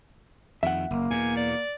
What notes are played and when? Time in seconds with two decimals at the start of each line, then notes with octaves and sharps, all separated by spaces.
0.63 F2 D#3 E5 F#5
0.91 F#1 A#3
1.10 E2 B2 G#5
1.37 D5